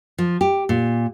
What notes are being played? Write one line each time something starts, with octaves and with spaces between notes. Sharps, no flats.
F3
G4
A#2